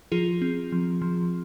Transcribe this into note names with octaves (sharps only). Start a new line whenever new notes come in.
F3 F4 G#4
C4
F3
F3